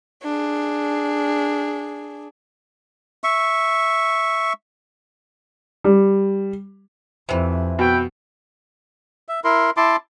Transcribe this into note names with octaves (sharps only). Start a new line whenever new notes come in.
D4 G#4
E5 C#6
G3
F2 C3 E3
B2 B4 E5 G5
E5
E4 A#4 C6
E4 A5 C6 D6